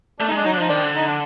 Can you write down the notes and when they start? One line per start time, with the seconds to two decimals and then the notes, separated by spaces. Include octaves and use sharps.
0.20 A3 D4
0.28 D#4
0.32 G#3 D4
0.45 F#3 D#4
0.52 D4
0.57 F3 D#4
0.68 D#3 C4 D4
0.83 D3
0.96 D#4
1.07 D4